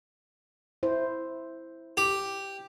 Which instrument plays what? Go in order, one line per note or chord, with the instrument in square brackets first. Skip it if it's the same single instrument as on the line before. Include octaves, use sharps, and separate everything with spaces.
[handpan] E4 C5
[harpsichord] G4